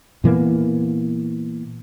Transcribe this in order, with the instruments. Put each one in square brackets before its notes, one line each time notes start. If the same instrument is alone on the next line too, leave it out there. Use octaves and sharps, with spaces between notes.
[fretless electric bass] A#2 E3 A#3 B3